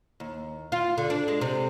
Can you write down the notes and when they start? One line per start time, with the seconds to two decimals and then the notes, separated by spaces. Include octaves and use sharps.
0.20 D#2
0.72 F4
0.98 D3
1.10 D4
1.28 G#3
1.41 C3